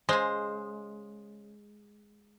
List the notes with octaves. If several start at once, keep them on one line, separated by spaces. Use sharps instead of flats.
C#3 G#3 C5